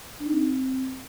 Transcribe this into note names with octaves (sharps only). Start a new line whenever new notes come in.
D4
D#4
C4